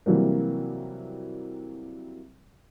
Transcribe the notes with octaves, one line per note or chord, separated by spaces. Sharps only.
C3 E3 F#3 G3 A#3